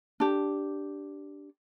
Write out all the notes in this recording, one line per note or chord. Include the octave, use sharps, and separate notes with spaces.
D4 G4